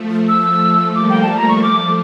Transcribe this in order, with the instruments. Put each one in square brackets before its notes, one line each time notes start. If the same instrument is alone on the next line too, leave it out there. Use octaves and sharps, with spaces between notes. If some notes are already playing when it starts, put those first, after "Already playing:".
Already playing: [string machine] F3 A3
[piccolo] E6
[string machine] G3 A#3 [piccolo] D6
[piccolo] G5
A5
A#5
C#6
[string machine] F3 A3 [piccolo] D6